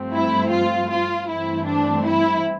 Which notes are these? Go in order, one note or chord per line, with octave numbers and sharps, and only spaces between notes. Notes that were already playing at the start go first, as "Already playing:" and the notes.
Already playing: G2 F3 A3 C4
E4
F4
F4
G2 E3 A3 C4 E4
D4
E4